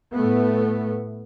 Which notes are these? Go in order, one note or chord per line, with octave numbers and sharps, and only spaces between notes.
A2 A3 B3